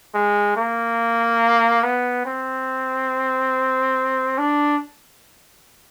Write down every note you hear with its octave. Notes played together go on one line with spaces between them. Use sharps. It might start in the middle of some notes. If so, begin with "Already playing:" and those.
G#3
A#3
B3
C4
D4